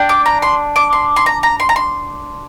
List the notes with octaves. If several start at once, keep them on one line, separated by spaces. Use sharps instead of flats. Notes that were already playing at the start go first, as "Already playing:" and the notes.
Already playing: D4 G4
D6
A#5
C6
D6
C6
C6
A#5
A#5
C6
A#5
C6